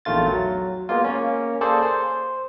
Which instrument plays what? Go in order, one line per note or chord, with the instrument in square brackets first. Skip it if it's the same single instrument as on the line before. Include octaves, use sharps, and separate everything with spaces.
[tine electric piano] A#1 E2 D#3 A3 F4 A6
F#3
G#3 A#3 B3 F4
A#3 C#4
A#3 G#4 A4 C5 D5
C5